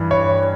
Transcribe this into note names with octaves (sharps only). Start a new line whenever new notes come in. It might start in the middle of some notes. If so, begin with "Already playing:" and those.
Already playing: G2 E3
C#5